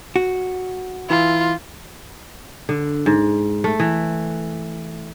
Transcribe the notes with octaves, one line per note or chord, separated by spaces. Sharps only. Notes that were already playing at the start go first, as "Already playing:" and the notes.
F#4
E3 E4 F4
D3
G#2
A3
E3